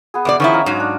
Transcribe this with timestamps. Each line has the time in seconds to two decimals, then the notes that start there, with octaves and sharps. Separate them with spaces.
0.14 B3 G#4
0.25 E2 B2 D5 D6
0.40 D#3 F3 C#4 D#4 E4
0.52 D#5 F5 A#5
0.66 G#2 F#3
0.80 D4